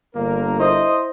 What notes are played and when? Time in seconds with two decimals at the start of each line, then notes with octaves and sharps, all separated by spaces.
0.15 G1 D3 A#3 A#4
0.60 E4 C5 D#5 D#6